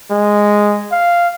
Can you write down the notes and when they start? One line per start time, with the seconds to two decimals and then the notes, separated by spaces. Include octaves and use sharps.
0.11 G#3
0.92 F5